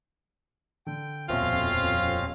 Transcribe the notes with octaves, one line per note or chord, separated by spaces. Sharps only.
D3 G5
D#1 F2 B2 C4 C#4 F4 E5 F5